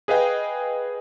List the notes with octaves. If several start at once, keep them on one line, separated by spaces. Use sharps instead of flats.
G#4 B4 D#5 F5 G5